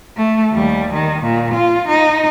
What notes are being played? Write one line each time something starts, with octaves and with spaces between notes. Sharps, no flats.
A3
D#2 G3
D#3
A#2
F4
D#4